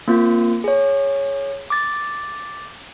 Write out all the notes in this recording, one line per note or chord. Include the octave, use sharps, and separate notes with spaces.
A#3 C4 F4
G#4 C#5
D6 A6